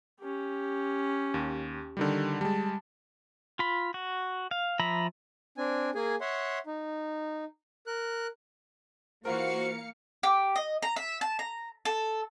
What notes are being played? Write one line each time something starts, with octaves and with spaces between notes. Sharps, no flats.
C#4 G4
D#2
D3 D#3 G3
G3 G#3 A5
F4 B5
F#4
F5
F3 E5 A#5 B5
C4 D4 G#5
A#3 G#4 G#5
C#5 E5 F#5 C6
D#4
A#4 F#6
E3 A#3 F4 F#4 A#4 C5 F5 C#7
G4
D#5
A#5
E5
A5
A#5
A4